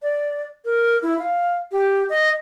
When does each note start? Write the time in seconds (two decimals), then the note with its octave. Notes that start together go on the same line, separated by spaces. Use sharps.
0.02 D5
0.65 A#4
1.03 E4
1.19 F5
1.72 G4
2.09 D#5